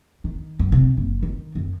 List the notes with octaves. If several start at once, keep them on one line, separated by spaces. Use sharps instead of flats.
D#3
F#2
C3
F#1
D#3
F#2